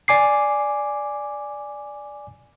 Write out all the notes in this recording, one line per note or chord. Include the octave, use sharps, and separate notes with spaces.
D5 G#5 D6 C7